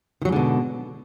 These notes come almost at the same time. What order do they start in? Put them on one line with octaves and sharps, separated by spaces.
D#3 F#3 G#2 D3 B2